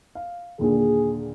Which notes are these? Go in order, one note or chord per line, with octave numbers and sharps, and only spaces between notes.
F5
D#2 A#2 D3 G#4